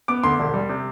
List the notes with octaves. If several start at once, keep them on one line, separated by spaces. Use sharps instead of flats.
B3 D6
D2 C6
E1
G3
C3